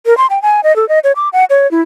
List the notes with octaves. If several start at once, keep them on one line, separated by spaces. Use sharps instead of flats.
A#4
C6
G5
G#5
D#5
A4
D#5
C#5
D6
F#5
C#5
E4